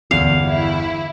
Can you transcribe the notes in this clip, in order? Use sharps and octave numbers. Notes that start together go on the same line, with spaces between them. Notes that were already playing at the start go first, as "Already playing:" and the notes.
G1 E2 F5
E4